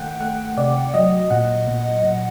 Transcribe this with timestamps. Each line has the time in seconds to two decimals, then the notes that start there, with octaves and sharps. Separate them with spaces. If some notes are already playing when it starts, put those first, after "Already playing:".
Already playing: D#3 A3 F#5 G5
0.21 A3 F#5
0.57 C3 D5
0.94 F#3 D#5
1.30 A#2 F#5
1.67 A#2
2.04 A#2